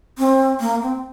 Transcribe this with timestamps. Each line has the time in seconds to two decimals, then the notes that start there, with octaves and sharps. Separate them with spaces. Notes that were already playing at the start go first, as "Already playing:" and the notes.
0.18 C4
0.60 A#3
0.82 C4